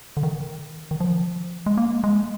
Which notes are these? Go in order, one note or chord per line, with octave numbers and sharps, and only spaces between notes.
D3
D#3
D#3
F3
G#3
A#3
G#3